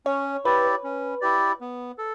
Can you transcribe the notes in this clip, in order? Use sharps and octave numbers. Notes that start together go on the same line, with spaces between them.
C#4 C#5
E4 G4 B4 D5
C#4
E4 G4 D5
B3
A4